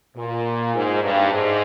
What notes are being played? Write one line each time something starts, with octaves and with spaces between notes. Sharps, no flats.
A#2
G#2
G2
G#2